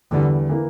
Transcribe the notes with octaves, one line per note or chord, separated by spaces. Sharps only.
E2 D3 E3 G3
E3 A#3